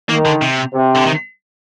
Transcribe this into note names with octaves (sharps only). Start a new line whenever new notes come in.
D#3 A#3
D3
C3
C3
D3
D#3